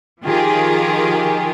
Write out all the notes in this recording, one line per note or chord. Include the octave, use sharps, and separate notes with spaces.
D#3 F3 F4 G4 G#4